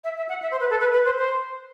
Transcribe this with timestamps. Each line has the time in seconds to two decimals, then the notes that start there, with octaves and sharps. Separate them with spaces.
0.04 E5
0.17 E5
0.29 F#5
0.42 E5
0.51 C5
0.60 B4
0.70 A4
0.80 B4
0.93 B4
1.05 C5
1.17 C5